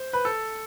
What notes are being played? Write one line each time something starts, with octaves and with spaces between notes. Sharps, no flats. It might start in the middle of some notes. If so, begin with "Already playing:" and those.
Already playing: C5
B4
A4